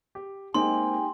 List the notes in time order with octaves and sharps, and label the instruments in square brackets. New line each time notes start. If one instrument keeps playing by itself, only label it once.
[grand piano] G4
[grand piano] G#3 A#3 C4 [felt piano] D#4 [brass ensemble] G4 G5 G#5 [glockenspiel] C6